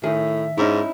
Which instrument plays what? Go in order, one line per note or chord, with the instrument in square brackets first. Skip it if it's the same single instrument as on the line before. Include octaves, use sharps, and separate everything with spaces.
[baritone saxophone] A2 [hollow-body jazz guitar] D#3 G#4 [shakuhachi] E5
[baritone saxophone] G#2 [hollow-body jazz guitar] C#4 D#4 E4